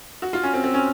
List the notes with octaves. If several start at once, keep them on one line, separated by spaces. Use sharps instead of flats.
F#4
F4
C#4
C4
C4
C#4